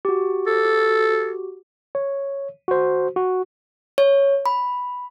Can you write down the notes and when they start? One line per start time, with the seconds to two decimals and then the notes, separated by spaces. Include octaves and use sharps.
0.05 F#4 G4
0.46 A4
1.95 C#5
2.68 F#4 C5
3.16 F#4
3.98 C#5
4.46 B5